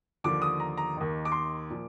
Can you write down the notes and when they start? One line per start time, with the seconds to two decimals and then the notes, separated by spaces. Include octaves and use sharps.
0.24 D#2 D3 F3 D6
0.42 D#6
0.60 A#5
0.77 A#5
0.97 D#2 D#3
1.25 D6
1.32 C6
1.70 A#2 F3